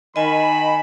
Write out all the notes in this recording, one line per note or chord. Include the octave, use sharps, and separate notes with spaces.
D#3 D#5 G#5 B5